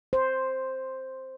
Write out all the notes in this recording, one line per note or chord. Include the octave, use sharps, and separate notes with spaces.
C5